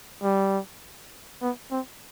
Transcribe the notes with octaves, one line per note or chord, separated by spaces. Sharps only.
G3
B3
C4